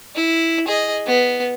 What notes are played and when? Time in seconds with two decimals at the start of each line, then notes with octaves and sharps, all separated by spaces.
0.15 E4
0.68 G#4 D#5
1.06 B3